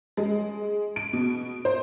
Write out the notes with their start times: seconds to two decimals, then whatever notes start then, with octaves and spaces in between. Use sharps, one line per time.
0.17 G#3
0.96 D7
1.13 B2
1.65 C5